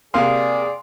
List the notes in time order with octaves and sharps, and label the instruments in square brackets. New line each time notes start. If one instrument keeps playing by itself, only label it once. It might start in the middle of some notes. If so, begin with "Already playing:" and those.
[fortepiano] C3 A#3 [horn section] G#4 D5 [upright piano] F5 [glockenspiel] C6